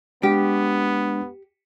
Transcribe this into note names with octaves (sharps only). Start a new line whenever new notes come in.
G#3 B3 D4 G4